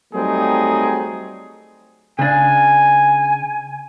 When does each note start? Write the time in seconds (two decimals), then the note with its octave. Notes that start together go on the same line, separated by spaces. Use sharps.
0.14 F#3 G3 A3 C4 D#4 G#4
2.19 C#3 D4 G#5